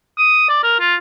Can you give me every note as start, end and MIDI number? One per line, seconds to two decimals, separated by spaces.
0.18 0.47 87
0.49 0.60 74
0.63 0.75 70
0.79 0.95 65